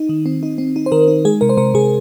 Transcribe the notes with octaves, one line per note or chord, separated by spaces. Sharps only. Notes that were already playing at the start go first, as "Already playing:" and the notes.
Already playing: D#4
D#3
C4
D#4
C4
D#4
C5
D#3 A#4
D#4
G#3 G#4
C3 A#4
C5
C3 A#4
C3 G#4